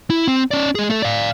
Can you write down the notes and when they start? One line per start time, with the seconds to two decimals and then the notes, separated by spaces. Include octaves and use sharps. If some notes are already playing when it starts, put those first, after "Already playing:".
0.10 E4
0.27 C4
0.51 C#4 D5
0.75 G#3 G#4
0.90 A3 A4
1.02 D5 F5